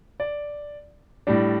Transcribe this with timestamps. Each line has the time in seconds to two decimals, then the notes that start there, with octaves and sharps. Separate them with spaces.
0.20 D5
1.27 A2 G3 D4